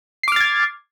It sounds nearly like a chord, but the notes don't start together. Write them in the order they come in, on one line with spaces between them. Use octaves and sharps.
C7 D6 F6 A6 G#6